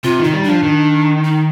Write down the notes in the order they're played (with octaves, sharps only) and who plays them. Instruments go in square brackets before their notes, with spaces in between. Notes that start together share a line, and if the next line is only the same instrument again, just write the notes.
[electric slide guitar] C3 [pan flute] F4
[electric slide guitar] D#3 [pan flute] D#4
[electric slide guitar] G3
[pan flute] D4
[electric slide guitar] F3
D#3
[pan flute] D#4